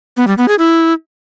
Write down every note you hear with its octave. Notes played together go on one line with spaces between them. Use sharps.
B3
G3
B3
G#4
E4